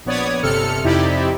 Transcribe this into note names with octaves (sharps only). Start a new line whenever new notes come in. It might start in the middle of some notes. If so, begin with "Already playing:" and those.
A#1 B3 C#5 D5 D#6 G#6
G1 C3 A4 F6 C#7
F2 C3 D#4 E4 G4 D5